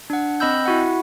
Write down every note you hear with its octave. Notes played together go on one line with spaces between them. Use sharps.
D4 F#5
C4 D#5 B5 E6 G6
E4 F#4 F#5